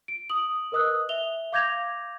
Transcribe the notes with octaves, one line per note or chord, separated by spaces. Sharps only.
D7
D#6 F#7
A#4 B4 D#5 D#6 E6 F#6
E5 F7 G7
F5 D6 G6 G#6 A#6 F7